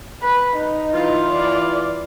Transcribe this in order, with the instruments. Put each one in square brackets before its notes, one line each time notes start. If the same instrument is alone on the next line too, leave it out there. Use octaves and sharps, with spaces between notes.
[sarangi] B4
D#4
[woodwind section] E3 E4 F4
[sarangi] D5